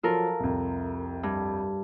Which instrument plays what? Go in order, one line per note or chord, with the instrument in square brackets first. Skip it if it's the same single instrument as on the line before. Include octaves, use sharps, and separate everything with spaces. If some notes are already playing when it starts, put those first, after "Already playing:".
[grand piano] F3 F#3 [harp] F4 A4 A#4
[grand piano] C2 F2
[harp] G2